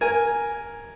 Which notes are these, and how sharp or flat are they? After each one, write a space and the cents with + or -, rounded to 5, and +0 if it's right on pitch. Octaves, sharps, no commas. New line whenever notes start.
A#4 +0 G#5 +0